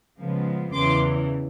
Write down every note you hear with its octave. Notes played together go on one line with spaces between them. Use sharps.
C#3 F3 G#3 B3
E2 C#3 E3 C6 D6